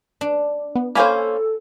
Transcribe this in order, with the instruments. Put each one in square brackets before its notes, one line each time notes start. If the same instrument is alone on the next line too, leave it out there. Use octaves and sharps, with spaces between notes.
[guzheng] D4
[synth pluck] B3
[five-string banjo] A#3 C#4 C5 [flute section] A4 [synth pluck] F5 G#5 B5